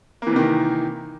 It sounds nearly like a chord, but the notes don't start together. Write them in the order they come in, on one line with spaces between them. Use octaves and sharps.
A#3 E3 C3 D#3